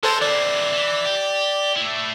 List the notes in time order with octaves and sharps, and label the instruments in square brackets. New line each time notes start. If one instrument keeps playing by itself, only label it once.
[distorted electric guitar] G#3 [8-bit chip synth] A4 C5 A5
[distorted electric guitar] E3 C4 [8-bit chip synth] D5
[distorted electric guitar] E3
G4
A3 E4